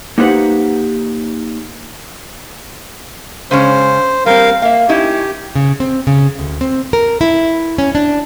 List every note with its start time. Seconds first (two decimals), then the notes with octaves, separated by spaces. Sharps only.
0.18 A#3 D#4 G4 B4 C5 F#5
3.51 C#3 G#3 C#4 C5
4.26 G3 C4 A#4 F5
4.62 A#3 E5 F5
4.89 C#4 D#4 E4 G4
5.55 C#3
5.80 C4
6.07 C#3
6.39 D2
6.61 C4
6.93 A#4
7.21 E4
7.78 C#4
7.95 D4